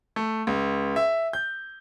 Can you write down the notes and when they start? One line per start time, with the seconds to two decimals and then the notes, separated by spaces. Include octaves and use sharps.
0.16 A3
0.47 C#2
0.96 E5
1.33 G6